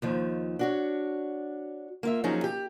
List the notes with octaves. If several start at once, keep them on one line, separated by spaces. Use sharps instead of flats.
D#2 D#3 F3
D4 F#4 C#5
A#3 F4 E5
F3 F#3 C#4 D#4 G#4
G4